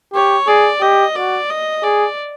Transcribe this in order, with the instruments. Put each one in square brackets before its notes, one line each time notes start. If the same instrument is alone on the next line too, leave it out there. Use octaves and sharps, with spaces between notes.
[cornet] G4 [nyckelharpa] C#5
[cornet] G#4 [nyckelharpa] D5
[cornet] G4 [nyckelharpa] D#5
[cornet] F#4 [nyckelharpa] D5
[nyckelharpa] D#5
[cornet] G#4 [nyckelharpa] D5